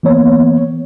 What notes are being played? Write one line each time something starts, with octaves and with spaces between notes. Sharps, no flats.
E3 A#3 B3 C#5